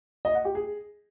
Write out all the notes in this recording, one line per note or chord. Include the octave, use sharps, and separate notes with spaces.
D#5
F#5
G4
G#4